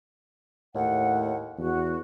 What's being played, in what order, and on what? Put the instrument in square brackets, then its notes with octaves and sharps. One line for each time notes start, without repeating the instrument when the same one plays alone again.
[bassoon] D#2 [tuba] A2 [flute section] F#5
[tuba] E2 [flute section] F#4